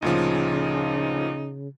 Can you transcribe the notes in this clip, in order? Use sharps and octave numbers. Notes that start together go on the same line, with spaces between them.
D2 A#2 C#3 F3 D#4